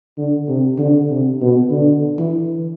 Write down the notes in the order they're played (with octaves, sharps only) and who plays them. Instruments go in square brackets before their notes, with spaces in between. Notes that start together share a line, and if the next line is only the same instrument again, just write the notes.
[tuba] D3
C3
D3
C3
B2
D3
E3